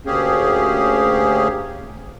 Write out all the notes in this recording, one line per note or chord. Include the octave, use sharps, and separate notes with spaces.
D2 A#3 C#4 G4 G#4